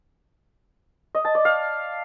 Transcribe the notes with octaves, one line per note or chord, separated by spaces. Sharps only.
D#5
A5
D5
F5